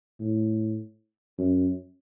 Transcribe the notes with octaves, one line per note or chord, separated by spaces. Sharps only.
A2
F#2